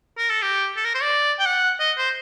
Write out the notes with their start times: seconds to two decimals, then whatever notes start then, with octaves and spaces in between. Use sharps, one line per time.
0.18 A#4
0.30 A4
0.42 G4
0.77 A4
0.85 A#4
0.95 C5
1.02 D5
1.39 G5
1.46 F#5
1.80 D#5
1.98 C5